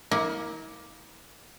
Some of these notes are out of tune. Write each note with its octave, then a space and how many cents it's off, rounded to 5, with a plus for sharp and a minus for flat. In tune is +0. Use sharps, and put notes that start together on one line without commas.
A#3 +15 E4 -45